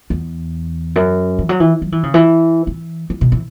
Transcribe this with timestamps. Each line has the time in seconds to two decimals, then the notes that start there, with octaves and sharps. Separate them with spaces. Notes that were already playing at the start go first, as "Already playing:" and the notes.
0.10 E2
0.96 F#2
1.39 E3
1.49 F#3
1.60 E3
1.82 F#3
1.92 E3
2.03 C#3
2.14 E3
2.67 E3
3.10 E3
3.21 B2
3.32 E3